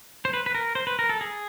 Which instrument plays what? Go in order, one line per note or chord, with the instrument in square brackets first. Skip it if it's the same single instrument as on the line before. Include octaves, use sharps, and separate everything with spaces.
[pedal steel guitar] C5
B4
B4
A#4
C5
B4
A#4
A4
G#4